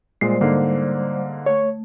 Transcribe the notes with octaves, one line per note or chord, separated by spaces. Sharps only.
A#2 G3 G#3 C5 D5 C7
G#2 D3 A#3
A3 C#5